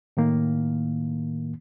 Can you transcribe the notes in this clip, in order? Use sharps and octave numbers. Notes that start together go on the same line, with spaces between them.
A2 D#3 A#3